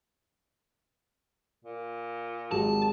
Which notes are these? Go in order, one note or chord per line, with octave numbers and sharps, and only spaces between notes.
A#2
G#1 F#3 G4 G#4 A5